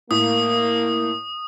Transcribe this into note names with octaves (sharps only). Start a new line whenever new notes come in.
A2 A#3 D#6